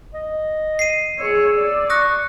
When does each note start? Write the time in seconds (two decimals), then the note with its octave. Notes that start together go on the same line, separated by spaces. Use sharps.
0.14 D#5
0.79 C7 D#7
1.19 G#4 C#5 E6
1.57 D5
1.90 C#6 D#6 F#6 A#6